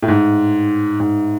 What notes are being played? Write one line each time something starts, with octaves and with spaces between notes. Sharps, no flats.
A2
G#2
G#2